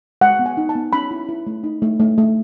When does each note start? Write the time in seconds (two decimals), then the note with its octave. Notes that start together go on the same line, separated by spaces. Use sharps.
0.21 G#3 F#5
0.39 B3
0.46 G#5
0.57 D#4
0.69 A5
0.75 B3
0.93 C#4 B5
1.11 E4
1.29 E4
1.47 A3
1.64 D#4
1.82 A3
2.00 A3
2.18 A3